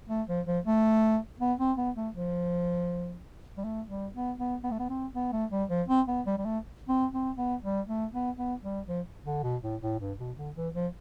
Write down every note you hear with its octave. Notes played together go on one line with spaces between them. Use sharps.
A3
F3
F3
A3
B3
C4
B3
A3
F3
G3
A3
G3
B3
B3
B3
A3
B3
C4
B3
A3
G3
F3
C4
B3
G3
G3
A3
C4
C4
B3
G3
A3
B3
B3
G3
F3
D3
B2
A2
A2
G2
B2
D3
E3
F3